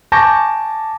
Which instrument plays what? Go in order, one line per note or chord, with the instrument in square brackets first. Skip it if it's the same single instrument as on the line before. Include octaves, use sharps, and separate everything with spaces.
[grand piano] G#5 A5 C#6 D6 G6 A#6